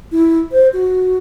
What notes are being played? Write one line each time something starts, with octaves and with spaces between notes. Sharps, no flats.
E4
C5
F#4